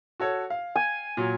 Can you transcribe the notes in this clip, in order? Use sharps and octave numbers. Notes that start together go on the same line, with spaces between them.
F#4 A4 C#5
F5
G#5
A#2 F#3